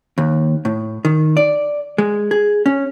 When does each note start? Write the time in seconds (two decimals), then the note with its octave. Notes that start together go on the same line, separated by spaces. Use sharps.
0.18 D#2
0.65 A2
1.05 D#3
1.37 D5
1.98 G#3
2.31 G#4
2.66 C#4